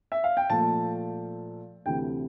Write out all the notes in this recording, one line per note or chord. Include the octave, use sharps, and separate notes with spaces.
E5
F5
G5
A#2 F3 A3 A5
D2 C3 E3 G5